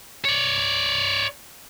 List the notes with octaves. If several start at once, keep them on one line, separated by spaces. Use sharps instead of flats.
C#5 D5